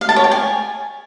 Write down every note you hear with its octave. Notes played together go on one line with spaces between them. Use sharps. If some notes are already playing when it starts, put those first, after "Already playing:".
F5
A5
C#5
G5
G#5